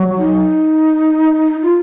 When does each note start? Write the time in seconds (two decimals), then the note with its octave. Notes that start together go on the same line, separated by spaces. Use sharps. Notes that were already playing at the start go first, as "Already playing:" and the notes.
Already playing: F#3
0.18 D#4
1.62 F4